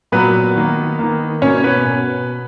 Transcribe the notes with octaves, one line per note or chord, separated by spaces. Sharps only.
A#2 F#3 A#3 B3 B4
D#3 A#3
D#3 A#3
B2 A#3 C#4 C#5
C#5
B3 B4
B2